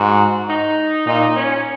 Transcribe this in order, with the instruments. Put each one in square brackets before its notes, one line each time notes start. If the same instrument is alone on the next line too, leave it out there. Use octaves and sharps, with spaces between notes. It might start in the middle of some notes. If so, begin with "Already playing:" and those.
Already playing: [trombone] G#2 [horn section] F#4
[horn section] D#4
[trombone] A#2 [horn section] D#4
[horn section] C#4